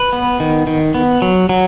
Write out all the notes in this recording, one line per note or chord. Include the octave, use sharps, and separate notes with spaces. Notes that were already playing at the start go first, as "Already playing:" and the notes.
Already playing: B4
B3
D#3
D#3
B3
F#3
F#3